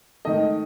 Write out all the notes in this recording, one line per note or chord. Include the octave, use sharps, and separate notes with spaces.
G#2 D#3 A3 D#5